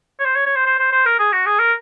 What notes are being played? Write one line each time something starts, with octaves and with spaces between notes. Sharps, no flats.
C#5
C5
C#5
C#5
C5
C5
C5
C5
A#4
G#4
F#4
G#4
A#4